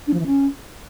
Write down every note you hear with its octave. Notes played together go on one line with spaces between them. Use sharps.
D4
F3
E3
C#4